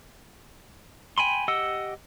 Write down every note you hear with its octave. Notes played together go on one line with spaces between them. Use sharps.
G5 G#5 B5 C6
G4 D#5 F#5 E6